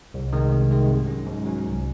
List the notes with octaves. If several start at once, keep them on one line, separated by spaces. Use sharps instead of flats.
C2
C3 D#3 G#3
C2
C3 D#3 G#3
G#2
F#3 C#4
G#2
F#3 C#4
C2